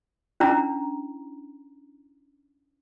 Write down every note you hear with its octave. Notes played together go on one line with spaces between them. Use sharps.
C#4 D4 E4 A#5